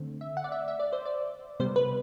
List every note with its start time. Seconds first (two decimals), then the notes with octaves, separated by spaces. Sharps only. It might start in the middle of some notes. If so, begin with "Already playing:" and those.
Already playing: D3 A3 C4
0.21 E5
0.37 F#5
0.44 D5
0.52 E5
0.68 E5
0.80 D5
0.93 C5
1.06 D5
1.60 C3 G3 B3 C5
1.76 B4